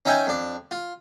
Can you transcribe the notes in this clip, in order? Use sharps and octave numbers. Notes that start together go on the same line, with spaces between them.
C#4 D#4 E5 G5 G#5
F2 D4
F4